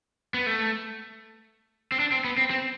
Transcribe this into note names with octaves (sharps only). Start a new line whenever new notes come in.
B3
A3
C4
D4
C4
B3
C4
C4